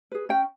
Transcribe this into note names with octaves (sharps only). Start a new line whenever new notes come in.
G#4 B4
C#4 G5